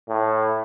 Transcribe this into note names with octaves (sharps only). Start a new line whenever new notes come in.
A2